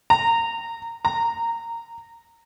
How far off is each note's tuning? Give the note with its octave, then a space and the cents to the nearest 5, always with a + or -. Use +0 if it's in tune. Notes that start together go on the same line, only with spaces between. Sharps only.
A#5 -20
A#5 -15